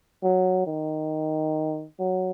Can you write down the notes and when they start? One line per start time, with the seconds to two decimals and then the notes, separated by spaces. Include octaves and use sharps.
0.23 F#3
0.67 D#3
1.99 F#3